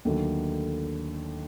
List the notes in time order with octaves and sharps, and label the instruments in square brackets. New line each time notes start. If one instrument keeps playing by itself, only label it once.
[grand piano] D#2 D3 F#3 A3